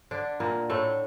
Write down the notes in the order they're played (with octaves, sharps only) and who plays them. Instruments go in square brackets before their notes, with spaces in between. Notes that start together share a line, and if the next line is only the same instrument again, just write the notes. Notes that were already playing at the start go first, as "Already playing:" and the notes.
[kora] D3 D4
A#2 A#3
A2 A3